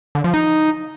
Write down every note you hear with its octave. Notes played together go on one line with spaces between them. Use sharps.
D3
F3
D#4